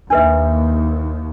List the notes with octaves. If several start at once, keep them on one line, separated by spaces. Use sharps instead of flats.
D#2 D4 B4 E5